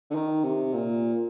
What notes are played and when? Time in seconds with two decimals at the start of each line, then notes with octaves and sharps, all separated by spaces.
0.10 D3
0.15 D#3
0.44 C3
0.74 A#2